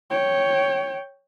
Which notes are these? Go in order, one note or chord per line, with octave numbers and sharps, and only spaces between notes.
C#5 G5